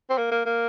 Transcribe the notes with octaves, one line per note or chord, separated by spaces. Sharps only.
C4
A#3
A#3
A#3